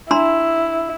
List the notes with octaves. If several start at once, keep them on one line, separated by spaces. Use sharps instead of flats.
D4 E4 A#5 C6